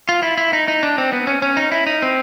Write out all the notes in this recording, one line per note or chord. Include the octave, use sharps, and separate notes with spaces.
F4
E4
E4
D#4
D#4
D4
C4
B3
C#4
C#4
D#4
E4
D#4
C4